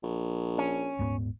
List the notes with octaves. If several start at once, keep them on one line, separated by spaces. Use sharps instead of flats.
A#1
C#4
D#1 G#2 B3